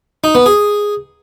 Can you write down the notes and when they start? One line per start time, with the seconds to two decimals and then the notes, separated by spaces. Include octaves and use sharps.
0.24 D#4
0.35 B3
0.46 G#4